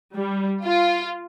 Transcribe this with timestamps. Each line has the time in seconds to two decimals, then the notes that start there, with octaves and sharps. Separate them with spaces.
0.16 G3
0.63 F4